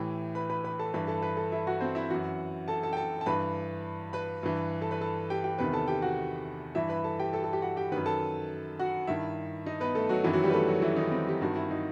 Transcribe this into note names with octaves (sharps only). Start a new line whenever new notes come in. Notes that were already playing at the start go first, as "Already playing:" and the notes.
Already playing: A2 E3 G4 G5
B4 B5
B4 B5
B4 B5
A4 A5
G2 E3 B4 B5
A4 A5
B4 B5
A4 A5
E4 E5
F#4 F#5
C4 C5
E4 E5
F#2 E3 F#4 F#5
A4 A5
A4 A5
G5
A4 A5
A5
G2 E3 B4 B5
B4 B5
G2 E3
A4 A5
B4 B5
A4 A5
G4 G5
G4 G5
E2 C3 D#3 B4 B5
A4 A5
G4 G5
F#4 F#5
G2 E3 E4 E5
B4 B5
A4 A5
G4 G5
A4 A5
A4 A5
G4 G5
F#4 F#5
G4 G5
F#2 D#3 B4 B5
A4 A5
F#4 F#5
G2 D#3 E4 E5
D#4 D#5
B3 B4
A3 A4
F#3 F#4
F#2 D#3 E3 E4
F#3 F#4
G3 G4
B4
A3 A4
F#3 F#4
E3 E4
D#3 D#4
C4
G4
G2 D#3 F#4
E4
D#4